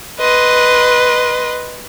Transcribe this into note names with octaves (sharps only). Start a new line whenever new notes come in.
B4 D#5 C6